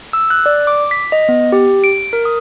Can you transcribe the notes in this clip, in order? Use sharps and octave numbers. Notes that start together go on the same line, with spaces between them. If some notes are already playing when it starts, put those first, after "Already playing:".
E6
F#6
D5
D6
B6
D#5
B3
G4
D7
A#4
D#6